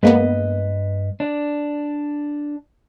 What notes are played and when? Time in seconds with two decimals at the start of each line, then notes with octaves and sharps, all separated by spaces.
0.03 G2 G#3 A#3 B3 B4 D#5
1.20 D4 D5